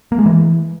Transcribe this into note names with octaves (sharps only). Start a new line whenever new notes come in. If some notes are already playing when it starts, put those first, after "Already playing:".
A#3
G#3
E3